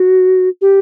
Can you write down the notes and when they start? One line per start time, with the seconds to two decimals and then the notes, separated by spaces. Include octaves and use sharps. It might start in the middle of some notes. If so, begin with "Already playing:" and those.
Already playing: F#4
0.61 G4